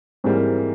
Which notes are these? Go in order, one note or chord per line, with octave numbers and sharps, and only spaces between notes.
G#2 E3 G3 A#3 C4